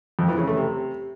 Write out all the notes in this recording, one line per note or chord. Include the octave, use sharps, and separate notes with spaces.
F2
E3
C#3
A3
C3